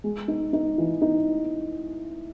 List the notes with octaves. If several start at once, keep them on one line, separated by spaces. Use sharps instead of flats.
G#3
D#4
D#4
E3
D#4